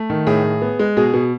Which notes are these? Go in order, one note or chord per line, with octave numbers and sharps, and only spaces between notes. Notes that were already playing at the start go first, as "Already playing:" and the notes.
Already playing: A3
D#3
A2 G#4
A2
B3
G#3
B2 G#4
B2